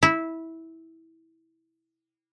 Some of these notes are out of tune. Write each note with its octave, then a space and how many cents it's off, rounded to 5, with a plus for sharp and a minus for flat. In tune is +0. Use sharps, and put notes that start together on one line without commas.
E4 -15